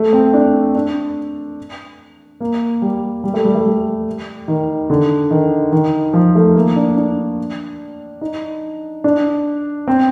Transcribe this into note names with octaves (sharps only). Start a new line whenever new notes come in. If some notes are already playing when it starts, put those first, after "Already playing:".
Already playing: A3
C4
D4
D4
A#3
G3
G3
A3
G3
A3
G3
D#3
D3
D#3
D#3
F3
A3
A#3
D4
D4
D#4
D4
C4